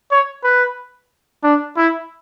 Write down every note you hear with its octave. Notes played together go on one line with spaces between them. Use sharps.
C#5
B4
D4
E4